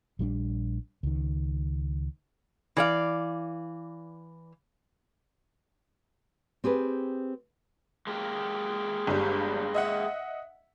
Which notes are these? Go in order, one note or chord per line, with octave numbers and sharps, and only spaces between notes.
A#1 G3 C#4 D4
C#2 D#3
E3 D5 F5
C4 G4 G#4 B4
G#3 A#3 G4
G1 G2 G3
D#5 E5 F#5